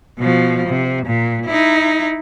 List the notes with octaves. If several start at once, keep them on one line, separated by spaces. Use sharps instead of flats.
B2 F3
C3
A#2
D#4 E4